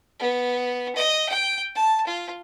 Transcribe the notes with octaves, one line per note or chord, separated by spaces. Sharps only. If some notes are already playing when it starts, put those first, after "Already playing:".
B3
D#5
G5
A5
F4